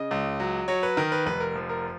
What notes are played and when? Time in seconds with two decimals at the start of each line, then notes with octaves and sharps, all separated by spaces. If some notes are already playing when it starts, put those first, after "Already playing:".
Already playing: C#3 D#5
0.11 C#2
0.40 F#3
0.68 F#3 C#5
0.83 B4
0.97 D#3 A#4
1.12 B4
1.26 F1 B4
1.40 A#4
1.55 F3
1.69 A#4